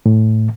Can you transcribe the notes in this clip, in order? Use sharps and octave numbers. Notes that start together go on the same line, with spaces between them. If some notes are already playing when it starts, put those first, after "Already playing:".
A2